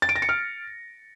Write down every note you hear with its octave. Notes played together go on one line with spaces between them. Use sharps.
A6
D7
A#6
C#7
F6